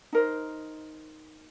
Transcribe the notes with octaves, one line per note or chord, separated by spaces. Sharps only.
D#4 A#4 C5